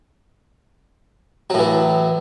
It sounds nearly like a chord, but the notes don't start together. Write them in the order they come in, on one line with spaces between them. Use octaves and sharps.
F#3 A2 E3